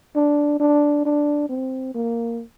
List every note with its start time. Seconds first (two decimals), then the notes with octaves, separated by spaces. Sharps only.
0.15 D4
0.59 D4
1.05 D4
1.49 C4
1.94 A#3